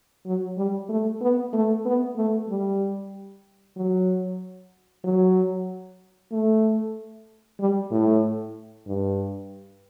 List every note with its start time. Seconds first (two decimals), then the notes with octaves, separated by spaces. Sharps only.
0.26 F#3
0.58 G3
0.89 A3
1.21 B3
1.53 A3
1.86 B3
2.17 A3
2.49 G3
3.77 F#3
5.04 F#3
6.32 A3
7.60 G3
7.92 A2
8.87 G2